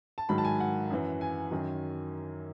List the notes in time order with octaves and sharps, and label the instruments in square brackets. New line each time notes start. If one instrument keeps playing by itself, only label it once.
[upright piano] A5
G#2 D#3 F#3 B5
A5
G#5
F#5
F#2 E3
G#5
F#2 D#3 F#3